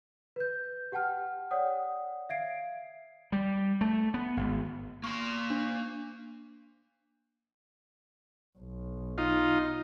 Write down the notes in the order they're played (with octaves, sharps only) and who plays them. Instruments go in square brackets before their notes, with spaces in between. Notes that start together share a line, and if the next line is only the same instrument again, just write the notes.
[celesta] B4 G6
G4 F#5 G5 A5 F6
C#5 D5 F#5 G5 D#6
E5 F5 G#6 C7 D7
[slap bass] G3
A3
B3
G#1
[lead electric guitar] A#3 C6 [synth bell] C#6
[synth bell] D4
[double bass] B1
[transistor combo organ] D#4 F4